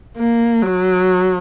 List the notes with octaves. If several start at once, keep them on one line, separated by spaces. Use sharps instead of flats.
A#3
F#3